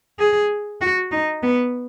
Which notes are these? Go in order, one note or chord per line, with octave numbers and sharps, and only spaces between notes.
G#4
F#4
D#4
B3